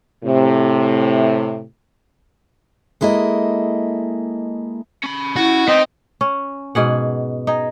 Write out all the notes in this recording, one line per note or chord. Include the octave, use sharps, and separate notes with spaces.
A2 C3
G#3 A#3 E4 A4 D#5
C#4 B5
E4 F#4
C4 D#4 B4 G5
C#4
G#2 B2 G#4 F#5
D#4 G#4